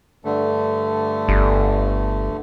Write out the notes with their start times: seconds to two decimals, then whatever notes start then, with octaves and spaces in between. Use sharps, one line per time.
0.25 G2 D3 A3
1.29 G1